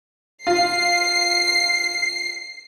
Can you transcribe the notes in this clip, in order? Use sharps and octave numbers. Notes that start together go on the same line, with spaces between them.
F4 C7